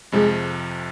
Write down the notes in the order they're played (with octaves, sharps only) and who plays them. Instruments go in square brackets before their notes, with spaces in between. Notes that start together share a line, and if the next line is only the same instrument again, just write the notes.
[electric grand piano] F2 C3 F3 [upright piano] G#3